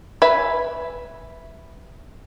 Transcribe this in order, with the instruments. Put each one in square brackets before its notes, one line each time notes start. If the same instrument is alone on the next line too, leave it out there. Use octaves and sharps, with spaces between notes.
[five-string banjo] B4 E5 G#5 B5